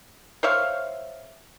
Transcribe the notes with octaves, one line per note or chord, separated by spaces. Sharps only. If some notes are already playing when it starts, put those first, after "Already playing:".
C5 C#5 E5 F5